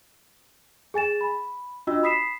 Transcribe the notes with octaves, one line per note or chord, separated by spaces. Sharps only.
G#4 G#5 A6 E7
B5
D4 F4 F#4 D#5 E6
B5 D#6 B6 C7 E7